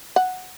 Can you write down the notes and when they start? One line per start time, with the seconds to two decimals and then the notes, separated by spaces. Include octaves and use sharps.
0.16 F#5